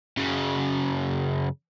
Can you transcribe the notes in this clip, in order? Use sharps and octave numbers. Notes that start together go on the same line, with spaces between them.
F#2 C#3